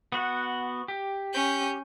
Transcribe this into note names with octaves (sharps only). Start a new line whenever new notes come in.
B3 F#4 F#5
G4
C#4 G6